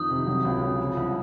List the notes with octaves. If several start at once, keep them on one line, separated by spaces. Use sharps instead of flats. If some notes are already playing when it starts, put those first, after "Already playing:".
Already playing: F2 D#3 D#6
C3
F#3
C#2
C#3
F3
C2